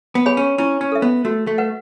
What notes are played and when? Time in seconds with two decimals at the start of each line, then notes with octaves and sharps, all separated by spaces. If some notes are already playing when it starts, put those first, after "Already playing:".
0.15 B3
0.26 G#4 C#5 G#5 B5
0.37 C#4
0.58 C#4 E4
0.81 C#4
0.92 A4 E5
1.02 B3
1.25 A3 F#4
1.47 A3
1.58 B4 F#5